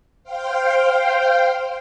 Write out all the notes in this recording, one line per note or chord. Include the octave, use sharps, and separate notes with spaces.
C5 F5 G5